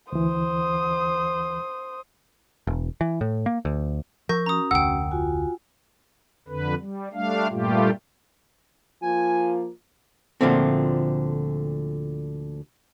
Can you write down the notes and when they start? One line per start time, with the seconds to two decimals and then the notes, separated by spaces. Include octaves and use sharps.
0.12 D2 E3 C5 D#6
2.67 E1
3.01 E3
3.21 A2
3.46 A#3
3.65 D2
4.29 F3 A#4 C#6 G6 A#6
4.46 C#4 F#4 A#5 D#6
4.71 F1 D2 F#5 G5 E6
5.11 F4 F#4 G#5
6.48 F2 D3 B4
6.79 G3
7.13 G3 A3 D4 F5
7.49 G2 A#2 G3 A3 F4 G4
9.03 F3 A#3 F4 G#5
10.41 D2 A#2 D3 F3 A3 C4